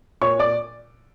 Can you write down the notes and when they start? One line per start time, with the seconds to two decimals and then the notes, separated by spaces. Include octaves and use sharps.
0.21 A#2 C#5 C#6
0.39 D5 D6